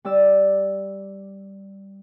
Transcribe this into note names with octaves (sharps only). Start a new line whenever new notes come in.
G3 D5 E6